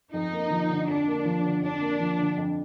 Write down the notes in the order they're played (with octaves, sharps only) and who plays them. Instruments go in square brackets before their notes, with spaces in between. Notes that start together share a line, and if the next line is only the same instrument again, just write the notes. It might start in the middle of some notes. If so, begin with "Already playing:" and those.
[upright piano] F2 [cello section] D#4
[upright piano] A#3
F3
D3
[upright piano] F2 [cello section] D4
[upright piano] A#3
F3
D3
[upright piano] F2 [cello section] D4
[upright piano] A#3
F3
D3
F2